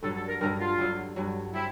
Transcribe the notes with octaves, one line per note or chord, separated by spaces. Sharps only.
G2 D3 F#3 A4
A4
A#4
G2 D3 F#3 A#4
F4
G2 D3 F#3
G2 D3 F#3
G3 C4 E4